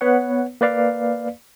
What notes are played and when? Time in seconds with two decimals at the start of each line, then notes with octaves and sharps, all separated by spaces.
0.01 B3 B4 C#5 F#5
0.61 A#3 B4 D5 F5